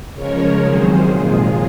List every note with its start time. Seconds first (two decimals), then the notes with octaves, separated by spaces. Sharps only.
0.13 C#3 F3 G#3 A#4 C#5
0.60 C3 D#3 F#3 G#4 C5
1.07 A#2 F3 G#3 F4 G#4